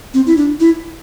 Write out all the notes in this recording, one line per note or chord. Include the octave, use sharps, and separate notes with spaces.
C4
E4
D4
E4